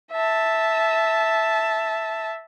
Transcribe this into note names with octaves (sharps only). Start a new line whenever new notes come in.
E5 A5